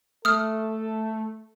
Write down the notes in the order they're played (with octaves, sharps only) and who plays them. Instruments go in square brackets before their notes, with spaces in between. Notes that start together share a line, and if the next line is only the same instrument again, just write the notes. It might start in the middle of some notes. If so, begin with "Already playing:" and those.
[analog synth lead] A3 [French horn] A4 [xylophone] D#6 F6